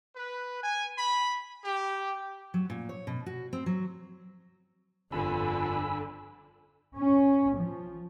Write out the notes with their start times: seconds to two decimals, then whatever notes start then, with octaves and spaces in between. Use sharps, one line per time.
0.16 B4
0.63 G#5
0.97 B5
1.64 G4
2.54 F#3
2.70 A#2
2.89 C#5
3.07 B2
3.26 F#4
3.53 C4
3.66 F#3
5.12 G1 F2 D3 F4 G#5 B5 E6
6.96 C#4
7.55 F3